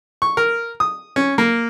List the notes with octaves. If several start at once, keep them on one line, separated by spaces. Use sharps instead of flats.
C#6
A#4
D#6
C#4
A#3